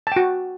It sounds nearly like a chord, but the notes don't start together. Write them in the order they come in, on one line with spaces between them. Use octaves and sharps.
A5 G5 F#4